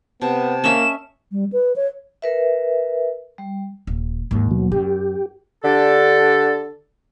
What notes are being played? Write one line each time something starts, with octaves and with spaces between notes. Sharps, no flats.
C3 B3 A5
A#3 C#4 D#5 E5 E7
G3
B4
C#5
A#4 B4 E5
G3
D#1
D#2 G#2 E3
B2 F#3
F#2 G4
D3 D4 G4 A4